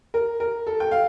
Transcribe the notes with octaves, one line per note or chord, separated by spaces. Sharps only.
A#4
A#4
A4
G5
F5